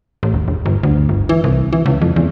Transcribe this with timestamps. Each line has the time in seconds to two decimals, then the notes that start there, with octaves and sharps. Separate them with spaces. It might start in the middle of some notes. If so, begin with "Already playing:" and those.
0.23 A1
0.34 D#1
0.48 E1
0.66 G1
0.83 D2
1.09 G1
1.29 E3
1.44 C2
1.73 E3
1.86 C#2
2.02 F2
2.16 E2